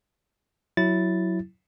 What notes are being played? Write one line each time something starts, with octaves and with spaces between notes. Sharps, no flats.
F#3 E4 A6